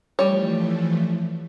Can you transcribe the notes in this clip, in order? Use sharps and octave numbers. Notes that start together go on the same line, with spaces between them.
E3 F3 G3 A3 C#5